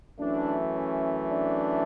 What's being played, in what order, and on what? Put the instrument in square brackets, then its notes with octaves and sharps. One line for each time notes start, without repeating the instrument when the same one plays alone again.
[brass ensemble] F#2 E3 A3 D4
C#4
D4